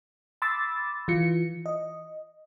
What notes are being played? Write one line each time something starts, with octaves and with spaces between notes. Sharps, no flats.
B5 C6 D6 E6 A6
E3 F4 C#7
D#5